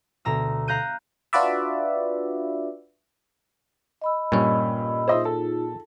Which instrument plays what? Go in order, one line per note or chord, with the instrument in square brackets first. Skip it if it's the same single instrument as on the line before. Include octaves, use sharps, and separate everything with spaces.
[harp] D2 B2 A#5 E6
F5 A#5 F#6 G6 D#7
[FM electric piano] D4 F4 F#4 B4 D5 E5
[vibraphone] D#5 B5 E6
[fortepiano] G2 [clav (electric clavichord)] A#2 C#4
[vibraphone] D#4 F4 G#4 [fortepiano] C5 D#5 E5
[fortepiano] A4